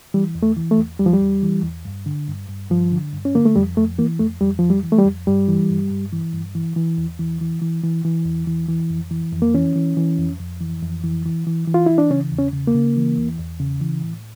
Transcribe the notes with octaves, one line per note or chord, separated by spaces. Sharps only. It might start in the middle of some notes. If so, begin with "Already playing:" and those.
E3 G3
E2
A3
E3
A3
E2
E2 G3
F3
G3
E2
E3
E2
G2
D3
G2
G2
G2 F3
D3
G2
C#4
D3 A#3
A3
F2 G3
F2 A3
E3 A#3
F2 A3
F2 G3
F2 F3
G3
E3
A3
G3
F2
G2 G3
E3
G2
G2
E3
G2
E3
E3
E2
E3
E3
E3
E3
E3
E2
E3
E3
F2
E3
F2
A#3
E3 C#4
E3
E3
F2
F2
E3
F2
E3
E3
E3
E3
F4
E3 E4
D4
C#3 C#4
E2
C#4
C#3
A#3
C#3
E3
E2
E2
C#3
E3
A2